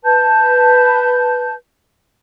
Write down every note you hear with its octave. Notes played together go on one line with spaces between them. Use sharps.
B4 A5 G6